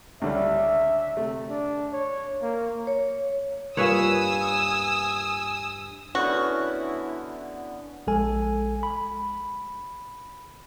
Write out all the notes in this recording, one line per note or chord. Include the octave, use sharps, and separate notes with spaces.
C#2 D3 G3 E5
C3 A3
D4
C#5
A#3
C#5
G2 A#3 F4 B4 C#5 G#5 D#6 E6
D3 B3 C#4 E4 F#4
A#1 G#3 A4 G#5
B5